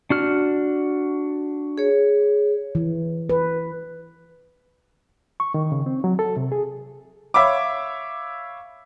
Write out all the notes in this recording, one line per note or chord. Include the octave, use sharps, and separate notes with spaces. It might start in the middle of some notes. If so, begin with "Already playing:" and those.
D4 F#4 F6
G#4 C#5
E3
B4
C#6
D#3
C#3
C4
F#3
A4
C3
G#4
C#5 E5 F5 B5 D6